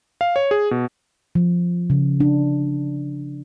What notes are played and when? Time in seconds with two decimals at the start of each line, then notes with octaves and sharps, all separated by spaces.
0.21 F5
0.36 C#5
0.51 G#4
0.71 B2
1.35 F3
1.90 C#3
2.20 D4